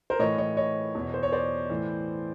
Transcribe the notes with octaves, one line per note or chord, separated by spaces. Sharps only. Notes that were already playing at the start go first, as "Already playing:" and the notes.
A#4 C5
A2 E3 C#5 D#5
C#5 D#5
C#5 D#5
E2 B2
C5
C#5
C5 D5
A2 E3